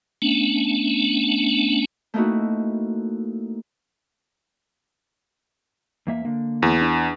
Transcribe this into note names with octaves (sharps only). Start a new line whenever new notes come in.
A3 B3 C#4 D4
A3 A#3 C4 D#4 E4 F#4
E2 A#3 E5
D3 A#3
E2
D4